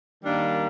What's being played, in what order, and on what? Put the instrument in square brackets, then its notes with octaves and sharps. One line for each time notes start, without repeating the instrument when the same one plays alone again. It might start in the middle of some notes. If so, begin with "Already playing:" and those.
[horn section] D#3 G3 A#3 D4